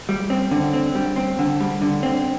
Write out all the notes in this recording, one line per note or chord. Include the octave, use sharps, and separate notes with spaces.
G3
C4
D3
C4
G3
C4
D3
G3
D3
C4